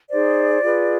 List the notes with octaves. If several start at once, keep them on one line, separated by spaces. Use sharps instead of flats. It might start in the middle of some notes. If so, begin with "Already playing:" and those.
D#4 G#4 C5 D5
F4 G#4 B4